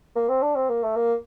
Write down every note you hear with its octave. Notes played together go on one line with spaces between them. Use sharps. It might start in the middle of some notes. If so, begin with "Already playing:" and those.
A#3
C4
D4
C4
A#3
A3
A#3